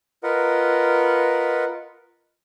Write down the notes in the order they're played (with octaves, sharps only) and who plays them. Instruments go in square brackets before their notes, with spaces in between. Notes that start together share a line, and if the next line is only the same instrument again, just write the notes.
[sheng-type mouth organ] F4 A#4 B4 D#5 F#5